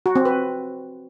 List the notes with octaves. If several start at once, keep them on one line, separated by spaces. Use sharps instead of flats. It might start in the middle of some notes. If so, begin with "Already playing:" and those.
F#4
C4
B4